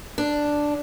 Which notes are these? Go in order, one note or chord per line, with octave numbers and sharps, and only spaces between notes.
D4